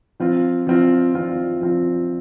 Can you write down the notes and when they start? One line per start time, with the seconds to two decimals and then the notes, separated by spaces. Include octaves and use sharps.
0.20 F3 C4 F4
0.67 F3 C4 F4
1.15 F3 C4 F4
1.61 F3 C4 F4